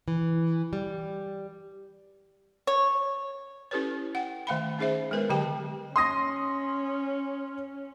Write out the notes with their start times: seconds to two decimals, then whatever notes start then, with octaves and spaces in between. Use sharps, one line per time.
0.08 E3
0.73 G3
2.67 C#5
3.71 C#4 E4 G4 A4 B4 C#5
4.15 F#5 G5
4.47 D#3 A3 E5 F5 G5 B5
4.79 C#4 D#4 G#4 C5 E5
5.11 G#3 B3 A#4 B4
5.30 D3 F#3 G4 G5 A5
5.96 C#4 C6 D#6 A#6